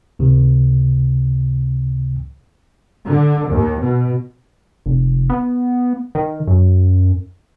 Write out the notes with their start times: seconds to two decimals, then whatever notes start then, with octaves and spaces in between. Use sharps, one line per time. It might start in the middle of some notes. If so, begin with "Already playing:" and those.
0.19 C#2 C3 D#3
3.05 D3
3.50 D#2
3.81 B2
4.86 F1
5.30 B3
6.15 D#3
6.47 F#2